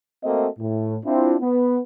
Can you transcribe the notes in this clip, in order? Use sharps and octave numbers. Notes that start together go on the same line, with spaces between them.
A3 A#3 C4 F#4 A4 D#5
A2
C4 D4 E4 F4
B3